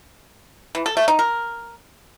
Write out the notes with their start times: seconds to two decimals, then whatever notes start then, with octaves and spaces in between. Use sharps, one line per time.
0.75 E3
0.86 A4
0.97 A3
1.08 D#4
1.19 A#4